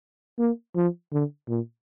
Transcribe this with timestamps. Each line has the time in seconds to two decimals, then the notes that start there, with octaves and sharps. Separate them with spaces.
0.39 A#3
0.76 F3
1.12 D3
1.48 A#2